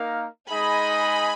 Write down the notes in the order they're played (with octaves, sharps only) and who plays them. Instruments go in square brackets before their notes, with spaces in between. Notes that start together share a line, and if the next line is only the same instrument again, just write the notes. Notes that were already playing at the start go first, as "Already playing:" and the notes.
Already playing: [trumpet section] A#3 D#4 A#4 F5
[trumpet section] G#3 D#4 G#4 D#5 [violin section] G#5 B5